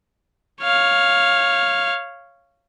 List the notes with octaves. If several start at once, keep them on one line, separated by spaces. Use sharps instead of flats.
C#5 F5